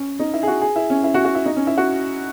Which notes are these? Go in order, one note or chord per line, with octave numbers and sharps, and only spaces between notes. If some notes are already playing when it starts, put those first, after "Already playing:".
Already playing: C#4
D#4
E4
G#4
F#4
G#4
E4
C#4
E4
F#4
F#4
E4
D#4
C#4
E4
F#4